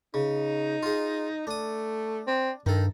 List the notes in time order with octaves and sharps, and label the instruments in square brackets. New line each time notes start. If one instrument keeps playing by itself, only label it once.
[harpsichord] C#3 [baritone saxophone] D#4
[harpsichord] F4 G#4
[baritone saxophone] A3 [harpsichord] D4 D#6
[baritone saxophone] C4
[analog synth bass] G2 [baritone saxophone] D#3 [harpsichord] D#4 A4